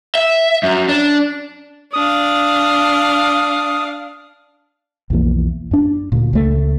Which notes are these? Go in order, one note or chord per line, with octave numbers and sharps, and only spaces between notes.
E5
F#2
D4
D4 F5 D#6
B1 F2 E3 A#3
F#2 D4
D2 A#2
C#2 A3